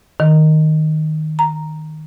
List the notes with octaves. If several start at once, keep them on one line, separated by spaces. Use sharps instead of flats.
D#3
A#5